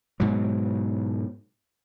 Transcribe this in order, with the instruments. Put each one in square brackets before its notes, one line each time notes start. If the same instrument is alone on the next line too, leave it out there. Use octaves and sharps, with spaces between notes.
[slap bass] G#2 B2 F#3